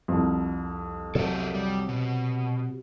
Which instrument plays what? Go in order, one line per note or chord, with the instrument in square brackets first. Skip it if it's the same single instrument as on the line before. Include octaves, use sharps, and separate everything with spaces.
[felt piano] C2 F2
[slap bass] C3 F#3 [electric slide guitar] A4 A#4 E5
[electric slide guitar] G3
B2